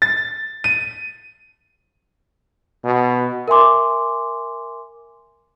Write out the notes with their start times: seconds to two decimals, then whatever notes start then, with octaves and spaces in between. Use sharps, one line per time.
0.02 A6
0.64 D#7
2.85 B2
3.48 A#4 E5 G#5 C6 D6